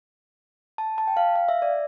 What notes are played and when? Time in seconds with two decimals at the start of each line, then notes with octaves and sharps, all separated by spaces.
0.78 A5
0.98 A5
1.07 G5
1.17 F5
1.36 F5
1.48 E5
1.62 D5